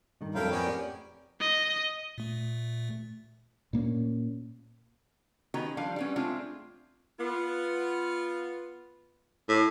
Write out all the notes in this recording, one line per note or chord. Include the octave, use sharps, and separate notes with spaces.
G2 D#3
F2 F#3 G3 E4 A4 A#4 F5 G5
A#3 B3 C#4 C#5 D5 G#5
G4 B4 D5
D#5
A#2 A3
A#2 A#3 B3 C#4
D#3 B3 C#4 F#4 G4 A#5
F3 G3 D4 F5
G3 B3 C#4
G#3 A3 C4 D4 F4
B3 F4
A2